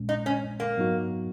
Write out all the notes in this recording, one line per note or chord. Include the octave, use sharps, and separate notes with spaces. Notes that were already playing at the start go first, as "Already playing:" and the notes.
Already playing: A#1 A#2 G#3 C#4
D#4
C#4
A#3
G#2 F#3 B3 D#4 F#4